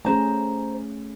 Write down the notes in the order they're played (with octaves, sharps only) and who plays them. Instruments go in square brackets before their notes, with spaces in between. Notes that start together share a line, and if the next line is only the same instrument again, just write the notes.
[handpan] A3 C#4 G#4 [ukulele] C5 A#5